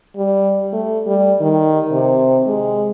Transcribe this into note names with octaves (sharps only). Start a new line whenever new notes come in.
G3
A3
G3
D#3
C3
G#3